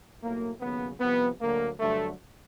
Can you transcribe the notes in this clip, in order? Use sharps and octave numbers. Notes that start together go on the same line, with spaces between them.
B1 A2 F#3 A#3
D#2 C#3 F#3 B3
C2 C3 F3 B3
D2 D3 F#3 A#3
G2 D3 F#3 A3